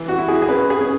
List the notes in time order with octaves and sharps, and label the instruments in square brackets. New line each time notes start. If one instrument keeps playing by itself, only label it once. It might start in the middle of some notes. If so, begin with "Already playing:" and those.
Already playing: [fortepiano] E3
F#4
E4
G#4
G#4
C#4 B4
G#4
C#4